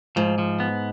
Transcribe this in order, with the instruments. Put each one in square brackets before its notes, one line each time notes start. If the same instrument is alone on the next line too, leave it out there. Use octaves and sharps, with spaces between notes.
[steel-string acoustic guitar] G#2 [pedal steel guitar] F3
[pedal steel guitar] F3
B3